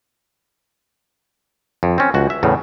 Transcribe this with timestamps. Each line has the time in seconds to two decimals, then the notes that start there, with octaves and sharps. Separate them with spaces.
1.83 F2
1.98 C4 C#4
2.14 C#2 F#4
2.30 E5
2.43 E2 A2 C#3